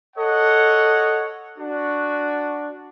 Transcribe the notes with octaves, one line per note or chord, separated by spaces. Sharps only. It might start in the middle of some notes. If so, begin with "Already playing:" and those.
A4 C#5 D#5 F#5
D4 F#4